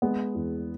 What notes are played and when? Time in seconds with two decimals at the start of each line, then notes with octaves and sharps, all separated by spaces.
0.02 G#3 B3
0.35 E2